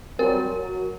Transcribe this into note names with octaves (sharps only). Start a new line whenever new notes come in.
F#3 G3 C4 A#4
F#3